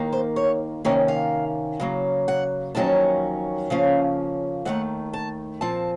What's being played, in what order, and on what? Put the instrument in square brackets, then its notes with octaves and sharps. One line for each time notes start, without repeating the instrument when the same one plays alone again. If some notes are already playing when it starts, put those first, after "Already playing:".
Already playing: [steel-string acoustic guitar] D#2 D#3 A#3
C5
C#5
C3 D#3 A#3 C#4 C#5
F5
C#3 F#3 A#3
F#5
F2 D#3 F#3 A#3 C#4 A5
C#3 F3 A#3 C#4 F5
D#2 D#3 A3 F#5
A5
A#2 F3 C4 A5